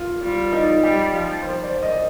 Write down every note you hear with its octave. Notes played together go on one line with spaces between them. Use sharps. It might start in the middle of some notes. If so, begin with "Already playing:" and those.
Already playing: F4
G3 F4
D#4
G3 G4
F3
C5
D5
D#5